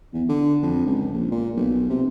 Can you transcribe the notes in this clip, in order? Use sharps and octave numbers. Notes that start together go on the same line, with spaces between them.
E2
D3
F2
C#2
A#1
A#2
B1
C3